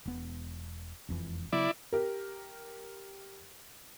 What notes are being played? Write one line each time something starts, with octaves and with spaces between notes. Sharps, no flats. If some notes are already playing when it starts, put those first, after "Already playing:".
E1 B3
E1 F2 E3
C#3 F#3 B3 E4 D5
G4 A#4